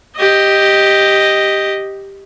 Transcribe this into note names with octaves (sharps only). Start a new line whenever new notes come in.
G4 D#5